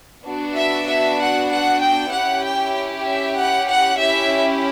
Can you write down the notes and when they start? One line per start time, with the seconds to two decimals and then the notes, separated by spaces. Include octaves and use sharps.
0.24 B3 D4 F#4
0.55 E5
0.87 E5
1.19 F#5
1.50 F#5
1.81 G5
2.12 C#4 E4 G4 F#5
2.44 G5
3.06 E5
3.36 F#5
3.69 F#5
3.99 C#4 E4 G4 E5